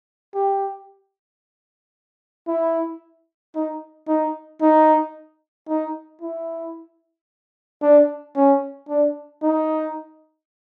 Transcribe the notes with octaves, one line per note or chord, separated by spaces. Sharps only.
G4
E4
D#4
D#4
D#4
D#4
E4
D4
C#4
D4
D#4